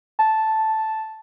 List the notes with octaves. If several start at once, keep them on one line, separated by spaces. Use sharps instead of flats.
A5